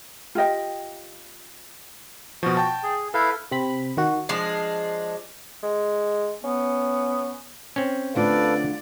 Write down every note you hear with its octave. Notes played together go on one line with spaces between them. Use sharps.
F4 G4 D#5 G5
B2 F3 F#4
G5 A5
G#4
E4 A4 B4 F5
C3 C4 B5
D#3 F#4
F3 G#3 D4 C7
G#3
B3 C#4
C4 C#4
D3 A3 F4 A4 B4 D5 F5